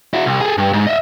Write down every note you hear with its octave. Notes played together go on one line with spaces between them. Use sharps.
E4 F#4
C2
G#4 A4
G2
G#2
D#5 E5